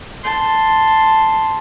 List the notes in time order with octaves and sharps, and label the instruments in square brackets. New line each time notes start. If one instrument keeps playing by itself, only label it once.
[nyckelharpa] A5 C6